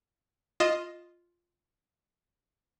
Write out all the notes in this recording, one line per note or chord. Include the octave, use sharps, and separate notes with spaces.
F4 D#5 E7